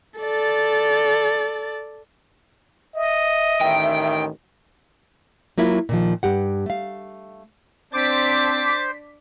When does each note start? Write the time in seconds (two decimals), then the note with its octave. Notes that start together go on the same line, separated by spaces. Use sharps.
0.20 A4 D5
2.95 D#5 E5
3.61 A1 D#3 G5
5.58 F#3 A#3 E4 F4
5.89 A#2 D#3 F3
6.23 G2 G4 F#5
6.66 A3 F5
7.93 C4 D4 C5 D6 A6 B6